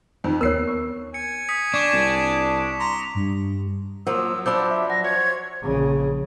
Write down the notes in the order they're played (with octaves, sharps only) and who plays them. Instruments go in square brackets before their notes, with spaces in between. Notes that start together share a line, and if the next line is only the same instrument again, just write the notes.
[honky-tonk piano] F2 D#3
[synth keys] D#2 B3 [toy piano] A#4 C#5 [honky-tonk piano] E6 C7
[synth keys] C#6
[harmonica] G#5 [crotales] C#7
[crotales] D#6 B6 C#7
[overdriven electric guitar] D4 [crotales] C#6 D6 E7
[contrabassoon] C2
[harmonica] A#5 C6
[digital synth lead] G2
[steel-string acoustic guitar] F3 A#3 F4 [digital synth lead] F#3 [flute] E6
[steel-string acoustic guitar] F3 D4 [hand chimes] B5 D6 G6 [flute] E6
[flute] E5
[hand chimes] F#5 [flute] A#6
[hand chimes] C5 [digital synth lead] C#5 [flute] G#6
[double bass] A#1 C#3